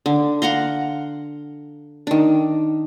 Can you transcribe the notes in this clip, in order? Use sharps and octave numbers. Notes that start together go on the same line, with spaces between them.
D3
F5 F#5 A#5 C6
D#3 D4